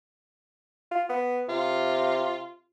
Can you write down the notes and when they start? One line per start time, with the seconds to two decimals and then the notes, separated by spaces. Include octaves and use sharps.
0.91 F4
1.09 B3
1.49 C3 F4